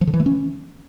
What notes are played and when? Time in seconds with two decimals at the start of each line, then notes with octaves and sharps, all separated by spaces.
0.01 F3
0.07 D3
0.14 E3
0.20 A3
0.26 C#4